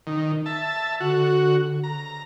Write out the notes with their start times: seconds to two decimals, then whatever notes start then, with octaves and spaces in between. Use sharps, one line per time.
0.07 D#3
0.46 E5 A5
1.00 D3 F#4
1.84 A#5